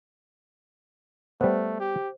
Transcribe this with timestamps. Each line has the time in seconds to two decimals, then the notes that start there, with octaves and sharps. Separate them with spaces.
1.41 G3 A3 B3 C5
1.80 G4